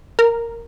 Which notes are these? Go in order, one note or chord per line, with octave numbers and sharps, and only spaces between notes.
A#4